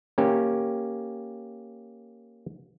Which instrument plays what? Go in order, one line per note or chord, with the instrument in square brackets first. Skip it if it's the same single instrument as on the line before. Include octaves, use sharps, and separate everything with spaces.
[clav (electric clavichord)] A#3 C#4 G4